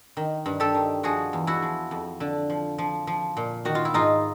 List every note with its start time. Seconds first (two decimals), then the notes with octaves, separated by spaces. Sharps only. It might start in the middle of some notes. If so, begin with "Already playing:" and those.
0.17 D#3
0.46 G2
0.60 G4 A4
0.74 D#3
1.03 F3 F#4 G#4
1.33 E2
1.47 E4 F#4
1.62 F3
1.91 F2
2.20 D3
2.50 F3
2.78 F3
3.07 F3
3.37 A#2
3.65 D#3 F#4
3.75 F4
3.85 E4
3.94 G#2 D#4 F4